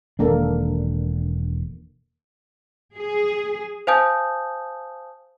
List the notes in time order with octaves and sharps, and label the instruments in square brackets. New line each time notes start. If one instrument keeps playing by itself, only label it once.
[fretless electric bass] E1 D4 [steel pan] D#3 A#3 A4
[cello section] G#4
[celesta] C5 F5 G#5 A5 D#6 G6